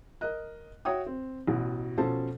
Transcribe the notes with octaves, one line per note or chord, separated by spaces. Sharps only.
A#4 D#5 F#6
F#4 C#5 E5 G5 D#6
C4
A1 B2
B2 F3 C#4 A4 C5 A5